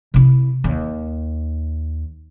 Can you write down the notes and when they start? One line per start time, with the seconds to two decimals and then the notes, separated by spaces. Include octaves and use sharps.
0.14 C3 E4
0.64 D#2